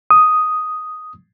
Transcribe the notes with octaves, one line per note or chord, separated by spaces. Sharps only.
D#6